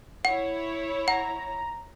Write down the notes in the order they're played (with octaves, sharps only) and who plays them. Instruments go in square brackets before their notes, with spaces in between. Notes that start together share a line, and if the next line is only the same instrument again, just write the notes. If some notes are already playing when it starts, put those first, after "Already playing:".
[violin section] E4 C#5 [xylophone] F#5
[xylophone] F#5 [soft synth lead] A#5